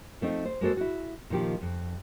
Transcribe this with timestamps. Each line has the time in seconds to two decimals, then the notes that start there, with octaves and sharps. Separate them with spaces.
0.21 F3 A3 C4 D#4
0.45 C5
0.61 G#3 A#3 F#4 A4 C5
0.77 E4 F#4
1.30 A#2 D#3 F3 G4
1.61 F2